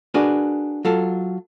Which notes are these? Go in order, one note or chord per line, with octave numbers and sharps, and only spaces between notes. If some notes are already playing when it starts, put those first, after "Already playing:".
D4 F#4 G#4 A#4 B4
F#3 F4 A4